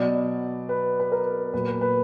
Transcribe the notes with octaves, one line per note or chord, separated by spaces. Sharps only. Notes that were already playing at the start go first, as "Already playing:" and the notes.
Already playing: B2 F#3 D5
B4
B4
A#4
A#2 F#3 B4
B4
B4